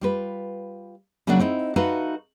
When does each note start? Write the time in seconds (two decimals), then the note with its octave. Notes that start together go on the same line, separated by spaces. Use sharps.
0.01 G3 F4 B4
1.27 C#3 F#3 A3 A#3 D4 F#4
1.39 C4 D#4 E4
1.76 D#4 F#4 A4 B4 E5 F5